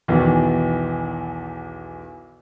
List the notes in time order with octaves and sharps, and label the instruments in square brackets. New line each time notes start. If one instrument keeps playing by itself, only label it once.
[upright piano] B1 E2 D#3 E3